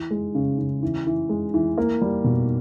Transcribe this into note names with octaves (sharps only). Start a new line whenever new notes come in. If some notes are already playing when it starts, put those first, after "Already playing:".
Already playing: E3
G#3
C#3
C#3
E3
E3
G#3
E3
A#3
G3
B2